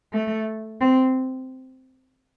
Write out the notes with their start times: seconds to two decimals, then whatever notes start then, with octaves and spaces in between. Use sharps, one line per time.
0.13 A3
0.81 C4